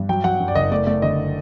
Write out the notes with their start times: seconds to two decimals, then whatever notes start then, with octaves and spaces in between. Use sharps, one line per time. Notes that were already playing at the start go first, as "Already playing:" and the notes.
Already playing: G2
0.09 F#3 G5
0.24 F#3 F#5
0.40 F#2
0.48 D5
0.55 F#1 D#5
0.71 A3 D5
0.87 A3 D5
1.02 D3 D#5